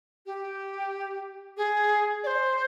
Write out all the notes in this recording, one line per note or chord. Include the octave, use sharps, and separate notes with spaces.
G4
G#4
D5
C5